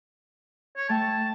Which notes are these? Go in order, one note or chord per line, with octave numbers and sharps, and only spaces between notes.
C#5
A3 G5 A5 C#6